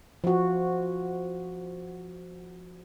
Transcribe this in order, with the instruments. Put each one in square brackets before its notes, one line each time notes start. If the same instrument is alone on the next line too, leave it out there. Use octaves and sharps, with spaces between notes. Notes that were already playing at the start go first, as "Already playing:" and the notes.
[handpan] F3 F#4